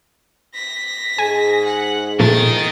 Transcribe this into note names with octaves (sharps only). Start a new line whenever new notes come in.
A#6 B6
G#2 G#4 G#5
F#5
A#2 D#3 F3 A3 A#4 A6